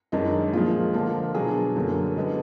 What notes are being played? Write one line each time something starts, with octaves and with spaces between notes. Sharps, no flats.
F#2 D#3 G#3 D4 D#4
A#2 F3 G#3 F4
D3 F3 A#3 D4
B2 F#3 D4 G#4
F#2 D3 F#3 A#3 D4
D3 G#3 B3 D4